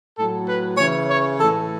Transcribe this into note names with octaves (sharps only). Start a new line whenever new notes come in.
A2 F#3 A4
B4
C#3 E3 C#5
C#5
A2 E3 A4